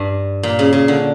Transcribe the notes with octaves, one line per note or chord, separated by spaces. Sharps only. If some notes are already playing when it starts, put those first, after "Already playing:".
Already playing: G2
A#2
C#3
C#3
D3